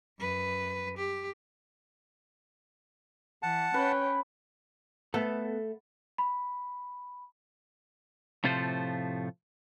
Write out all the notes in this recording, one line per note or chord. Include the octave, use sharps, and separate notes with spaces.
F#2 B4
G4
E3 F#5 A5
C#4 B4 C#5 G5
A3 B3 A4
B5
A2 C3 F3 A3 F4 C5